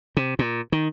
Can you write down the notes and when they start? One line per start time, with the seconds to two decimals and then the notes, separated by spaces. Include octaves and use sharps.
0.17 C3
0.39 A#2
0.72 D#3